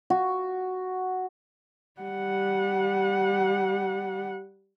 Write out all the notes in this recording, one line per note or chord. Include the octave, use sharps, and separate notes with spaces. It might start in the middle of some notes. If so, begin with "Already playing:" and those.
F#4
G3 F#5